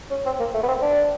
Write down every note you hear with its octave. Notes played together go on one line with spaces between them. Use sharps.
C#4
C4
A#3
A3
B3
C4
D4